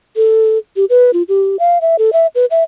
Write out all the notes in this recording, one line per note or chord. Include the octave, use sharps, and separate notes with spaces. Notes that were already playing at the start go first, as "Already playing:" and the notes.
A4
G4
B4
F4
G4
F5
E5
A4
E5
B4
E5